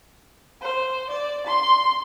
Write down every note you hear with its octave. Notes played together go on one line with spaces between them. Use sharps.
C5
D5
C6